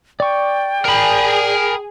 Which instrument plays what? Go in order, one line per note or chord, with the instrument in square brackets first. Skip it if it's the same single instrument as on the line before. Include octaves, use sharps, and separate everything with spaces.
[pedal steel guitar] D5 C#6 [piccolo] G5
[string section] G#4 [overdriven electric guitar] A#4 B5